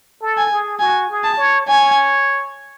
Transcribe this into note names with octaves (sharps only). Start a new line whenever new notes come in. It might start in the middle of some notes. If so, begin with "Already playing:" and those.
A4
G#5
G#4
F#4 G#5
G#4
A5
C#5
C#5 G#5